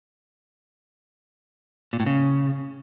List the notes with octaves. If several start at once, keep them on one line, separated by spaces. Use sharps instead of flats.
A#2
A2
C#3